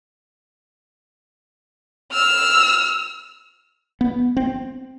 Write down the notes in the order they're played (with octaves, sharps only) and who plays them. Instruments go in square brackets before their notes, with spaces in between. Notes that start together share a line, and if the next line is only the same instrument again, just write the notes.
[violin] E6 F6
[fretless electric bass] B3
C4